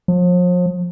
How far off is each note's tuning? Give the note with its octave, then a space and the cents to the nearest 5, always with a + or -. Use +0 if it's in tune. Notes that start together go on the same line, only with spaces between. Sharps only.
F3 +40